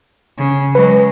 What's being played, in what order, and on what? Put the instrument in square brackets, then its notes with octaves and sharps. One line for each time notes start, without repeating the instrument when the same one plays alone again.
[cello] C#3
[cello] F#3 G#3 [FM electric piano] B4